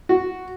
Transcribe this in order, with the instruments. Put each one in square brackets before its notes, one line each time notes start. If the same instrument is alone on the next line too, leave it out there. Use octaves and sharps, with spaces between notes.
[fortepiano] F#4